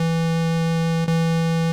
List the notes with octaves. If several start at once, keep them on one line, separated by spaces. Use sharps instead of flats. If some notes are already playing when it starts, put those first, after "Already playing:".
Already playing: E3
E3